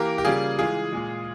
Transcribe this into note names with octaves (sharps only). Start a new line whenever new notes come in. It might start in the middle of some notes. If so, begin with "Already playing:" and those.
Already playing: E3 A#3 G4 A#4
G4
C#3 G3 A#3 F4 G#4
E3 G#3 F4 G#4
A#2 G#3